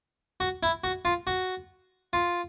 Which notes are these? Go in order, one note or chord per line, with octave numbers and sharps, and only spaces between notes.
F#4
E4
F#4
F4
F#4
F4